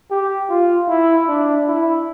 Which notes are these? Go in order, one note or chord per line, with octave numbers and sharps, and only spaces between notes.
G4
F4
E4
D4
E4